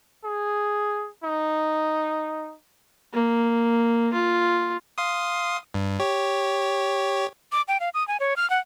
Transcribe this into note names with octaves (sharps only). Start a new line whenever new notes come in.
G#4
D#4
A#3
F4
F5 C6 D#6
G2
G4 C#5
D6
G5
F5
D#6
G#5
C#5
F6
F#5